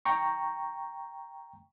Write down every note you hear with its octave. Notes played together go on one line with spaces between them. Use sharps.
G5 A#5 C#6